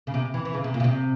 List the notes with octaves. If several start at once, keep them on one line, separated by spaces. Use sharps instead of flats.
C#3
C3
E3
E3
C#3
C3
A#2
C#3
C3